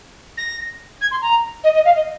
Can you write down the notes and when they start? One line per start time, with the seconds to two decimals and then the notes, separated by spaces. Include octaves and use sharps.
0.37 A#6
1.01 G#6
1.11 C6
1.22 A#5
1.64 D#5
1.74 D#5
1.85 F5
1.95 D#5